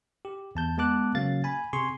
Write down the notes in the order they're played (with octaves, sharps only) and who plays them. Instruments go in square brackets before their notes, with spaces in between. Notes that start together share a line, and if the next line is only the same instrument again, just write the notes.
[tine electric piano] G4
E2 A5 G6
G#3 B3 A5 D6 F#6
C#3 F#3 A#3 F5 A6
G#5 B5
C3 G#4 G#5 C6 C#6